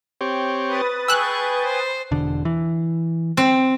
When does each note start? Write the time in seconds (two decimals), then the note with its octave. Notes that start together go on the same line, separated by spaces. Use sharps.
0.21 C4 G4 C#5
0.69 B4 D#6 A6
1.08 G#4 G5 G#5 C#6 E6 F#6
1.64 C5
2.11 E1 D3
2.45 E3
3.37 C4